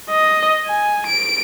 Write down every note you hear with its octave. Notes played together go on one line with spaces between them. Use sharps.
D#5
G#5
D7